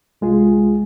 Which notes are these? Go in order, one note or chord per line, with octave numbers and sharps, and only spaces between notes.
C2 G#3 F4 G#4